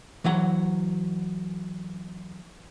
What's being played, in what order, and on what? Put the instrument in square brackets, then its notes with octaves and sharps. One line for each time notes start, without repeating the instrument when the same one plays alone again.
[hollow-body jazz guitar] E3 F#3 F#5